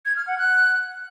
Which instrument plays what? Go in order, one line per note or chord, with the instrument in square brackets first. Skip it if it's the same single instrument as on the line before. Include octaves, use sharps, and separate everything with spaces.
[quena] G#6
F6
F#5
F#6